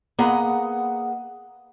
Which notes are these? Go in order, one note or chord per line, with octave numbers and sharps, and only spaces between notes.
A#3 B3 G#4 D#5 F#5 A#5